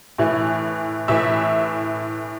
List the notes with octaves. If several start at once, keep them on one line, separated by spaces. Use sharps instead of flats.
A2 E3
A2 E3 E5